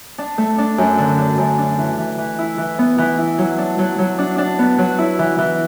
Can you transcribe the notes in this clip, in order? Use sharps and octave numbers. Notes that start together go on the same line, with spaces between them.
D4
A3
D4
F#2
D3
D4
F#2
D4
E3
E3
E3
E4
E3
B3
E3
E4
F#3
D4
F#3
F#3
D4
D4
B3
F#3
E4
E3
E3